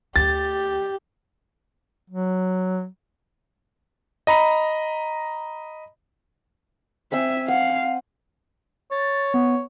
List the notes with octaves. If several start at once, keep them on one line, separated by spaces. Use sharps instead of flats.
D2 D4 G4 A6
F#3
D#5 A#5 B5
C4 C5 E5 G#5
F5 F#5
C#5 A6
B3